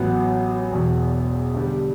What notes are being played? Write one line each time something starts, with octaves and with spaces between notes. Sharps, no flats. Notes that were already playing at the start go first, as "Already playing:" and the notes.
Already playing: A1 A2 F#3 B3
E1 E2 B2
G2 D3 G3